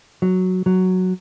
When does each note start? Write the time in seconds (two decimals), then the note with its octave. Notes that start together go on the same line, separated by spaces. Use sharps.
0.22 F#3
0.66 F#3